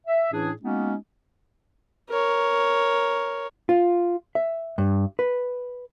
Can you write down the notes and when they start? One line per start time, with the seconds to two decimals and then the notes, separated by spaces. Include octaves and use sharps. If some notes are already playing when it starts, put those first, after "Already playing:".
0.07 E5
0.32 A2 E3 C#4 D4 G#4
0.62 G#3 A#3 B3 C#4 D#4 F#4
2.10 A#4 C#5
3.69 F4
4.35 E5
4.78 G2
5.19 B4